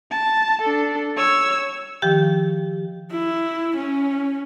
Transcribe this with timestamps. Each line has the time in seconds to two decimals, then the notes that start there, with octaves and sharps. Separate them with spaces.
0.11 A5
0.62 D4 A4
1.17 C#5 E6
2.02 D#3 F3 G4 G5
3.11 E4
3.76 C#4